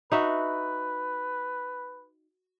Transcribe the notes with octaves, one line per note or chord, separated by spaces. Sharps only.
D#4 F#4 B4 E5